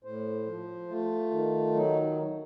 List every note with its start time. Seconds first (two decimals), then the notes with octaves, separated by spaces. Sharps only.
0.04 A2 C5
0.46 F3
0.89 A3 F4
1.31 D#3
1.74 F#3 D#4